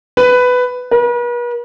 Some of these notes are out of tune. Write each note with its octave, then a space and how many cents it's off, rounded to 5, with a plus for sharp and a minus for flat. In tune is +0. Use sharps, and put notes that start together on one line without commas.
B4 +10
B4 -45